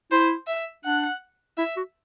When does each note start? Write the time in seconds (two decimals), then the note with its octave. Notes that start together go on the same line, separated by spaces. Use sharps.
0.11 E4 C5
0.47 E5
0.85 D4 F#5
1.58 E4 E5
1.77 F#4